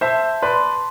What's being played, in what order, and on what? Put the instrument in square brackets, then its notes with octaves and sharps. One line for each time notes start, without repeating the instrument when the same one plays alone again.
[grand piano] C5 E5 [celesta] A5
[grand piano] B4 D5 [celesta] C6